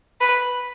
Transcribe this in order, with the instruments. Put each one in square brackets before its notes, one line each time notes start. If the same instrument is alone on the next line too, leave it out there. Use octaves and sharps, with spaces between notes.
[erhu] B4